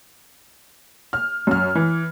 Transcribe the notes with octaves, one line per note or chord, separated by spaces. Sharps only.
F6
F#2 F6
E3